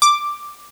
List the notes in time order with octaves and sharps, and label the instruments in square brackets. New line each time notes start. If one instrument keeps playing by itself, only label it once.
[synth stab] D6